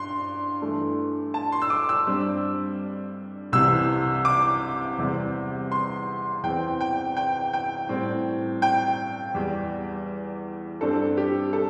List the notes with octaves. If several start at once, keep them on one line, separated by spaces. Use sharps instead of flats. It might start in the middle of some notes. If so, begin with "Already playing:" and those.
Already playing: G2 C6
G2 E3 A3
A5
C6
E6
D6
E6
G2 G3 C4
C2 C3 E3 E6
D6
E2 C3 G3 C4
C6
E2 E3 C4 G5
G5
G5
G5
A2 G3 C4
G5
E2 E3 G3
G2 G3 C4 A4
G4
A4